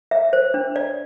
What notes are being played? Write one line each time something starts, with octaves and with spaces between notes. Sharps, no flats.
E5
C5
D4
D5